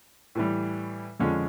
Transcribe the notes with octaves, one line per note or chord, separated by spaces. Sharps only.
A2 E3 G3
F2 D3 F3 G#3 C#4